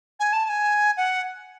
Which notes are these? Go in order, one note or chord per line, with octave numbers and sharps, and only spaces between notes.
G#5
A5
A5
G#5
F#5